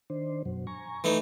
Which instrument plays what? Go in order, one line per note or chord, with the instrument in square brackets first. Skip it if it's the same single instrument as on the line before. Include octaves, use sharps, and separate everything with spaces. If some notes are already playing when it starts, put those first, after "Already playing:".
[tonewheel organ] D#3 D4 C5
F#2 B2 F#3
G#5 A#5 C#6
[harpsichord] E3 A3 D#4